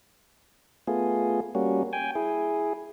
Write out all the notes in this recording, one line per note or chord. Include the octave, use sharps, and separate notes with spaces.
A3 B3 F4 G#4
G3 A#3 C#4 F#4
G5 G#5
E4 G#4